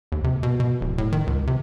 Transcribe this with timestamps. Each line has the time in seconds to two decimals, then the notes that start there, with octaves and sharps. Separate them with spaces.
0.12 D#2
0.24 C3
0.43 B2
0.60 B2
0.81 D1
0.98 A2
1.12 D#3
1.27 C#2
1.47 C3